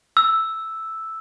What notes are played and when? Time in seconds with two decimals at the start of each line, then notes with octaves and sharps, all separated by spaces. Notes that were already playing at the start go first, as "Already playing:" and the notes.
0.17 E6